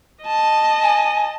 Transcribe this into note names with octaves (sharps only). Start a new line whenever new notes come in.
D#5 A5
G#5